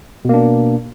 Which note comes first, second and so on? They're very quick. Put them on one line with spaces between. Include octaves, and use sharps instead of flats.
B2 A#3 D4